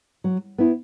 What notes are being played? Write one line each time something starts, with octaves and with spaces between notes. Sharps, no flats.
F#3
B3 E4